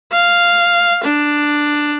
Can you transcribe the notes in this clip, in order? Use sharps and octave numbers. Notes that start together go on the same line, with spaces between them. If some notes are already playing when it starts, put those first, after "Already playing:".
F5
D4